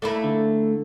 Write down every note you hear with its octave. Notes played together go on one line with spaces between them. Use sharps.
A3 A#3 E4
D3